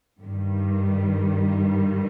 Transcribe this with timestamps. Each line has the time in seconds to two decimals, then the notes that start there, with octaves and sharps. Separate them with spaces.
0.21 G2 D#3 G3